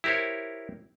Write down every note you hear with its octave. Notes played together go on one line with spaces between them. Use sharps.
E4 G4 A#4 C5 C#5